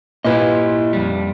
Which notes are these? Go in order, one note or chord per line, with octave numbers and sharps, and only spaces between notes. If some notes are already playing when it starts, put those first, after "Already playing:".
A#2 E4 G4 B4 D#5
F2 G3